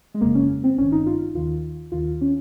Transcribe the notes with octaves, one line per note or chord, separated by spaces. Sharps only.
G#3
G1 F2 C#3 A#3
C#4
C4
G#1 G2 D#3 C#4
D#4
F4
D#2 D#3 F4
D#2 D#3 F4
C#4